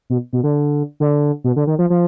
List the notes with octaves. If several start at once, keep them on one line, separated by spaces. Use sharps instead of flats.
B2
B2
D3
D3
B2
D3
D#3
F3
F3